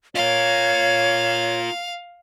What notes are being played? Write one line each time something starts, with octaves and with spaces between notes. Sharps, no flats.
F4 A#4 C#5 F5